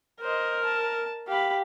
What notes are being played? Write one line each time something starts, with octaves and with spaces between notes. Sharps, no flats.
A#4 C5 D#5
A5
G4 F5 B5